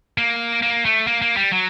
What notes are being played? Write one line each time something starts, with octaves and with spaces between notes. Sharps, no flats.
A#3
A#3
A3
A#3
A#3
G3
F#3